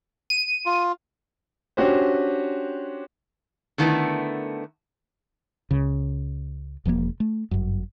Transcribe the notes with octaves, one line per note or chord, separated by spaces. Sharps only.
D#7
F4
C#4 D4 F#4 G4 C5
D3 D#3 A3 B3 E4
C#2 C#3
E1 F3 F#3 A#3
A3
G1 F#2